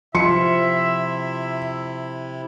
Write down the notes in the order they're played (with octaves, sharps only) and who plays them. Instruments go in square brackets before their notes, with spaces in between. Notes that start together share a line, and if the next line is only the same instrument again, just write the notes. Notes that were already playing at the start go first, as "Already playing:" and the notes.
[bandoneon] C3 E4 [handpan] F3 F4 [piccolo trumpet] E5 [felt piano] C6 C#7